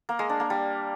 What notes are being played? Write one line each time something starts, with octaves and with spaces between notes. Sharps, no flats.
A#3
G#3
D4
A#3
G3